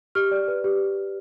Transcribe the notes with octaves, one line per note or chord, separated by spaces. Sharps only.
G4 F6
D5
B4
G4